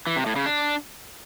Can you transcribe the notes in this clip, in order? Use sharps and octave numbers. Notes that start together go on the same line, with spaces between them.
E3
C3
A2
C#3
D4